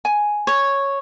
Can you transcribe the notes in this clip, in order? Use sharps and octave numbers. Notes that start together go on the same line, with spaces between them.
G#5
C#5